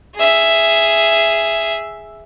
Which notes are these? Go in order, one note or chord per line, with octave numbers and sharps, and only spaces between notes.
G#4 E5